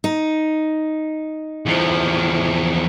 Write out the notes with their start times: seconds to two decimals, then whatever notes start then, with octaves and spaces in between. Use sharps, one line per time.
0.04 D#4
1.66 E2 F3